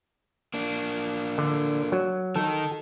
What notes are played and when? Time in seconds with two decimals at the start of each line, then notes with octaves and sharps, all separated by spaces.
0.54 A#3 D4
1.38 D3
1.92 F#3
2.36 D#3 D#4 A4